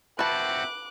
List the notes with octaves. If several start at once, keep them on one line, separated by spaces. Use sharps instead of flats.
C4 F#4 B4 E5 A5 D6 F#6